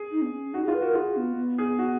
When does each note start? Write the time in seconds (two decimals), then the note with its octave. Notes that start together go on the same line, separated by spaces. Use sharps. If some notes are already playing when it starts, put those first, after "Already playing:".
Already playing: G#4
0.12 D#4
0.22 B3
0.33 C#4
0.53 D#4 F#4
0.64 F4 G#4
0.74 B4
0.81 F#4
0.85 A#4
0.95 F4 G#4
1.16 B3
1.37 B3
1.58 G#4
1.79 F#4